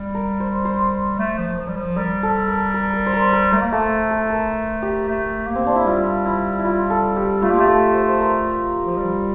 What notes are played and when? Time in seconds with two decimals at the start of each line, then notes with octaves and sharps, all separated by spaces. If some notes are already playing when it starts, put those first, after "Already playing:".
Already playing: G3
0.14 A#4
0.40 C5
0.65 C5
1.19 A3
1.38 F3
1.57 F3
1.69 G3
1.76 F3
1.96 G3 A#4
2.23 A4
2.48 A#4
2.74 A#4
2.94 A#4
3.06 C5
3.13 A#4
3.33 A#4
3.52 A3 A#4
3.62 A#3
3.72 A3 A4
4.11 A4
4.30 A#4
4.82 G4
5.08 A3
5.47 A#3
5.55 C4
5.66 D4
5.75 E4
5.86 G3 F4
6.25 E4
6.59 E4
6.64 F4
6.90 A4
7.16 G4
7.42 A3 F4
7.51 A#3
7.58 A3 G4
7.67 A4
7.94 C5
8.09 C5
8.20 A#4
8.86 F3
8.97 G3